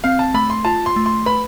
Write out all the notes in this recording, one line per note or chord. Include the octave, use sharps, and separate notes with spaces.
C4 F5
A5
A3 B5
C6
F4 A5
C6
A3
C6
B4 B5